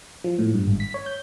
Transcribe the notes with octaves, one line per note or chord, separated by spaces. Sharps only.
F3
A2
G2
G#1
B6
C#5
G6